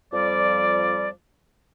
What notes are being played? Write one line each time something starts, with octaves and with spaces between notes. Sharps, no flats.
F2 F3 G3 D5